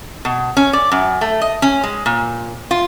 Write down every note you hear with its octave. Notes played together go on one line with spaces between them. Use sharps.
B2
C#4
D5
F#2
A3
D#5
C#4
G#3
A#2
F4